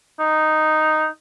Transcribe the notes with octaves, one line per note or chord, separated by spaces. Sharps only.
D#4